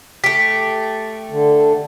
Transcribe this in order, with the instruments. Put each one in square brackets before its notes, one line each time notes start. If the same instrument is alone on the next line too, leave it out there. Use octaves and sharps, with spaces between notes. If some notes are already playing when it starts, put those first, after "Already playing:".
[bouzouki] A3 G4 [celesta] B6
[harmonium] D3